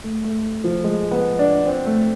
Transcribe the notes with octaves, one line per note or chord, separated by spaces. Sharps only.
A3
A3
F3
G#3
B3
D4
C4
A3